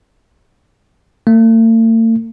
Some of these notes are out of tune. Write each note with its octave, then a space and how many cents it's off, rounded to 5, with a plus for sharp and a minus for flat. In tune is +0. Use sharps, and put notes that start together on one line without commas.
A3 +45